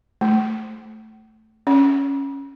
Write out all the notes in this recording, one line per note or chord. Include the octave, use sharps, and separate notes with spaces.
A3
C#4